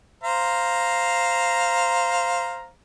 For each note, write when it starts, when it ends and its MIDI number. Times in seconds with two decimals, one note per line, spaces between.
0.24 2.68 72
0.24 2.68 77
0.24 2.68 82